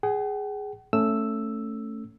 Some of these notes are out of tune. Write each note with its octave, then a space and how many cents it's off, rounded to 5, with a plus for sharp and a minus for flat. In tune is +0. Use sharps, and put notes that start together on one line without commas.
G#4 +0 F#5 +45
A3 +10 C#4 +0 E6 +0